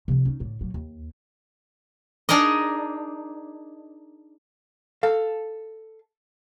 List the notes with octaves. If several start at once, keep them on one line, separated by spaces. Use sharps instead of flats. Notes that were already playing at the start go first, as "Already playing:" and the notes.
C3 F3
C#4 D#4
A2 D3
A#2 F#3
D#2
D4 D#4 G#4 A#4 D#5
A4 F5